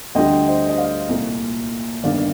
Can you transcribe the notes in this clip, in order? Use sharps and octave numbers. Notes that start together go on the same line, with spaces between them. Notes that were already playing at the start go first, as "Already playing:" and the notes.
D2 D3 G3 D#5 G5
C5 D#5
D#5
D5 F5
C2 A#2 A3
G1 G2 D#3 D5 F5